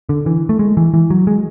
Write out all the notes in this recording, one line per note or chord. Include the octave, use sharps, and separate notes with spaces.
D3
E3
A3
G#3
E3
E3
F#3
G#3